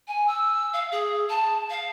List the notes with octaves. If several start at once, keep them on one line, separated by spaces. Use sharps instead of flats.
G#5
E6
F5
G#4
A5
F5